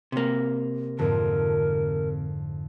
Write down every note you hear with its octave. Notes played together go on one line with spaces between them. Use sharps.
C3 A#3
F2 G#2 D3 A#4